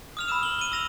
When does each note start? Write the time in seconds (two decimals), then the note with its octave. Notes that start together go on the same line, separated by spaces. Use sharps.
0.17 D#6 F6 F7
0.28 B5 D#6 E6 E7
0.43 F#7 G7
0.59 D#7 G7
0.72 E6 A#6 F7